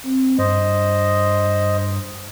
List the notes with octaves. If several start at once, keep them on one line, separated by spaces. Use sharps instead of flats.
C4
G2 C5 D#5